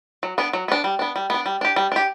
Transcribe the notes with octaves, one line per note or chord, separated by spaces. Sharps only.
F#3
B3 D4
F#3
B3 D4
G3
B3 D4
G3
B3 D4
G3
D4 G4
G3
D4 G4